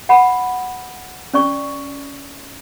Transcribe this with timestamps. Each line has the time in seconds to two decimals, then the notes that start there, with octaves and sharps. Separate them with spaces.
0.09 F#5 B5
1.34 C#4 D5 C#6